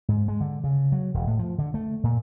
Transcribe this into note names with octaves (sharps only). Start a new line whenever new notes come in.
G#2
G#3
D3
C#3
F#3
E1
A2
F3
D3
A3
A#2